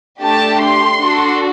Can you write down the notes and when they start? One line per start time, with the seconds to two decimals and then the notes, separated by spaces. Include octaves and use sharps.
0.21 A3 D4 G4 A5
0.61 C6
1.00 D4 F#4 A4